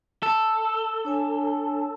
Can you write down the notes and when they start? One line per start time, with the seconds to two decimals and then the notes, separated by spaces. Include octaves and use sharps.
0.23 A4
1.05 D4 C#5 G#5